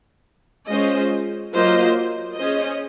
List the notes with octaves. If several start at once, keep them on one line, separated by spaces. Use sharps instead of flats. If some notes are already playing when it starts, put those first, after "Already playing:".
G#3 C#4 F4 C5 D#5
F#3 A#3 F4 C5 D#5
C#4 G#4 C5 D#5